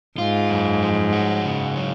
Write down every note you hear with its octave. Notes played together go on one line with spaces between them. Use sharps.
G#2 F4
F#2
F3
F#4
C#3
F#3